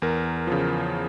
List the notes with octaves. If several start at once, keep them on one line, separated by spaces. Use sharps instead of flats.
E2 A#4
C#3 F3